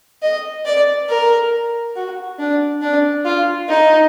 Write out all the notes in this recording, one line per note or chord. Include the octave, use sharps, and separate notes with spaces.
D#5
D5
A#4
F#4
D4
D4
F4
D#4